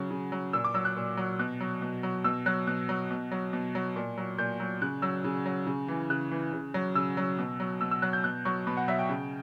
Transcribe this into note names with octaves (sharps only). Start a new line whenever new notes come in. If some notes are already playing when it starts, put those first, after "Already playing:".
Already playing: C#3 F#3
C#3
F#3
A#2 E6
D6
F#3 E6
F#6
A#2
F#3
B2 F#6
F#3
B2
F#3
B2 E6
F#3 F#6
B2 F#6
F#3
B2
F#3
B2
F#3
A#2
F#3
A#2 G6
F#3
C#3 F#6
F#3 E6
C#3
F#3
C#3
E3
C#3 F#6
E3
C#3
F#3
C#3 E6
F#3
B2
F#3
B2 E6
E6
F#3 F#6
G6
B2 F#6
F#3 C#6
B2 B5
F#5
F#3 E5
G5
C#3